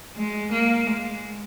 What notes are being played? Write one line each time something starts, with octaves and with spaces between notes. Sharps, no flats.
G#3
A#3
G#3